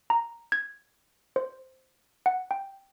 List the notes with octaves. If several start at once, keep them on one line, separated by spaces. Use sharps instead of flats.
A#5
G#6
C5
F#5
G5